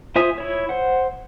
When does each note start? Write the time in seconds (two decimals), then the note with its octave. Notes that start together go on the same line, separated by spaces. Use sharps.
0.16 F4 C5 E5 G#5 D#6
0.38 E4 C#5
0.69 C5 F#5